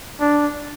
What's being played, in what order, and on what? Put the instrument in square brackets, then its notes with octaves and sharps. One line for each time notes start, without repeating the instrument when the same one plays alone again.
[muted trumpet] D4